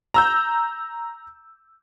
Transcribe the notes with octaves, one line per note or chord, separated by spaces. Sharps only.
A#5 E6 G6